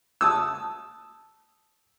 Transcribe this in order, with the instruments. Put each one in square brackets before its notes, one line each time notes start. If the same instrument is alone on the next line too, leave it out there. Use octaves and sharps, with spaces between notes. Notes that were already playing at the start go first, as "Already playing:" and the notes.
[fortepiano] A5 D#6 E6